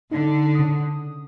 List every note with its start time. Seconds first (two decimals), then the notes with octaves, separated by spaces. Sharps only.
0.11 D3 D#4
0.55 C#3 D#6